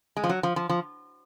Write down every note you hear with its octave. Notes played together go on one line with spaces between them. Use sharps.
G#3
F3
F#3
F3
F3
F3